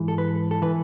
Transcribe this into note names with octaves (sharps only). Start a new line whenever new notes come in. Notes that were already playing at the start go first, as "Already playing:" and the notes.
Already playing: G#2 E3
A4
B4
A4
E3 B4